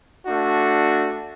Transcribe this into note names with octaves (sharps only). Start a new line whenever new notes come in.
A3 D4 F#4